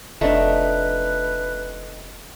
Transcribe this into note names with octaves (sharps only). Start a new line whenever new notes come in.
F1 A3 D4 D#4 B4